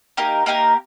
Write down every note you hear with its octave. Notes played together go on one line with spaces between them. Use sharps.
A#3 D#4 G4 A#4
A#3 D#4 G4 A#4